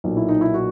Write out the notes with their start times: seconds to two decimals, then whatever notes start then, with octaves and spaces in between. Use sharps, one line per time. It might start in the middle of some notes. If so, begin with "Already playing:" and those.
0.04 B1 A#2
0.17 E4
0.29 D#4
0.41 E4
0.54 F#4